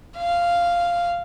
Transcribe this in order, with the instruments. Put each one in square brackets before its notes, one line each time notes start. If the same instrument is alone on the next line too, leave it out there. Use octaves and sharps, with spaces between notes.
[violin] F5